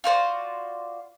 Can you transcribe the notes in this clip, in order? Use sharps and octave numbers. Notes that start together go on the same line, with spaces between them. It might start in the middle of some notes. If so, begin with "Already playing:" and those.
F4 F#4 C5 D5